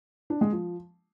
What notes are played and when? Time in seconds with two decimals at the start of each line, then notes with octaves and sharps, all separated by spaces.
0.30 D4
0.41 G#3
0.52 F3